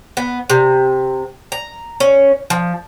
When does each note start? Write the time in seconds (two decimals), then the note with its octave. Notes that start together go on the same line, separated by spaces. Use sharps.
0.17 B3
0.50 C3
1.52 A#5
2.00 C#4
2.50 F3